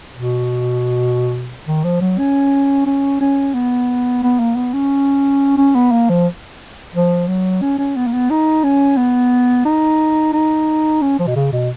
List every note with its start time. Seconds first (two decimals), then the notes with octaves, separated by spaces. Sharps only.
0.15 B2
1.68 D#3
1.84 F3
2.01 F#3
2.19 C#4
2.86 C#4
3.21 C#4
3.54 B3
4.23 B3
4.40 A#3
4.56 B3
4.74 C#4
5.58 C#4
5.75 B3
5.92 A#3
6.09 F3
6.95 F3
7.28 F#3
7.62 C#4
7.78 C#4
7.96 B3
8.07 A#3
8.13 B3
8.30 D#4
8.64 C#4
8.97 B3
9.65 D#4
10.33 D#4
11.02 C#4
11.19 F3
11.27 B2
11.36 C#3
11.52 B2